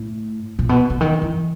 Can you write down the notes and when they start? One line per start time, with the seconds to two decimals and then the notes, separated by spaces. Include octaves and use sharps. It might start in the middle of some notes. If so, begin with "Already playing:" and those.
Already playing: A2
0.59 A#2
0.69 B2
0.90 D3
1.01 D#3
1.22 E3